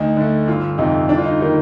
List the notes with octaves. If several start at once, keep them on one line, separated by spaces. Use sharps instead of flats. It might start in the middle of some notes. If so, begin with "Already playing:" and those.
Already playing: D2 D#4
D3 A3
G1 F4
F2 C3 D#4
G1 D4
F4
D#4
D#3 G3 A#3 D#4